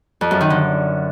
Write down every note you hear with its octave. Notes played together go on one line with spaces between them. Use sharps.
F2
F#2
D#3
D3